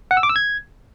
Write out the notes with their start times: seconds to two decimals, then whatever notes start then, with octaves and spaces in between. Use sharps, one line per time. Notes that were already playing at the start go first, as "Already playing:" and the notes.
0.11 F#5
0.17 E6
0.23 D6
0.29 E6
0.36 G#6